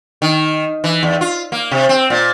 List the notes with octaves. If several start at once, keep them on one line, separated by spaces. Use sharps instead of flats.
D#3
E3
E2
F4
A#3
C3
C4
A#2